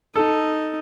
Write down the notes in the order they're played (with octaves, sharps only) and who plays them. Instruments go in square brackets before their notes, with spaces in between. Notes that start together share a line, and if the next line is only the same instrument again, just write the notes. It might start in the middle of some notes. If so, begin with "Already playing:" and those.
[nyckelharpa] D#4 [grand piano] A4